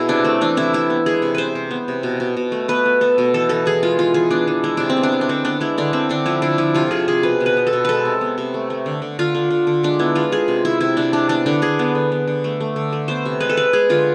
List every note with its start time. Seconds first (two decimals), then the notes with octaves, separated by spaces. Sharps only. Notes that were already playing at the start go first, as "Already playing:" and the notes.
Already playing: B2 E4 G#4
0.09 C3 D4
0.24 A3 C4
0.41 E3 D4
0.57 C3 E4
0.73 C3 E4
0.90 B3
1.06 G#3 G#4
1.22 C3
1.35 C3 B4 C5
1.55 C3
1.71 B3
1.88 C3
2.03 B2
2.20 B2
2.37 B2
2.52 A3
2.68 B3 B4
2.86 B3
3.01 B3 A4
3.18 B2
3.34 E3 A4
3.49 E3 A4
3.66 E3 G#4
3.83 G#3 F4
3.99 E3 F4
4.14 E3 G#4
4.31 B3 D4
4.47 E3
4.64 G#3 E4
4.77 C3 D4
4.90 C4
4.97 B3
5.03 D4
5.12 G#3
5.21 D4
5.29 D3 C4
5.45 B3 D4
5.61 G#3 E4
5.78 D3 D4
5.93 D3 C4
6.09 D3 D4
6.26 F3 E4
6.42 D3 D4
6.58 F3 E4
6.74 C3 F4
6.91 C3 G#4
7.08 C3 G#4
7.23 B2 B4
7.40 B2
7.46 B4
7.57 B3
7.67 A4
7.73 B2
7.85 G#3 A4 B4
8.05 C3
8.21 B3
8.38 C3
8.54 A3
8.70 A3
8.86 D3
9.02 D3
9.19 D3 F4
9.35 D3
9.51 D3
9.67 D3
9.83 G#3 D4
9.99 B3 E4
10.16 G#3 F4
10.32 G#3 G#4
10.48 C3
10.65 C3 E4
10.81 C3 E4
10.97 C3 D4
11.13 G#3 D4
11.29 B3 D4
11.46 D3 D4
11.62 D3 G#4
11.79 B3
11.95 D3
12.12 B3
12.28 D3
12.44 A3
12.60 A3
12.76 D3
12.93 A3
13.08 B3 C5
13.25 C3
13.40 G#3 B4
13.49 A4
13.57 G#3 B4
13.73 G#3 G#4
13.89 D3 F4